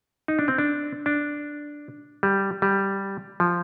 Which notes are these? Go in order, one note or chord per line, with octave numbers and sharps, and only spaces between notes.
D#4
D4
C4
D4
D4
G3
G3
F3